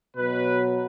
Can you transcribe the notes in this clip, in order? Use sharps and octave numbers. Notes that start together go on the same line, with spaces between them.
B2 F#3 B4